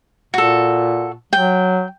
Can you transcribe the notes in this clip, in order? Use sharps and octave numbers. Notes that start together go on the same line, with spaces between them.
A#2 F#4 A4
F#3 G5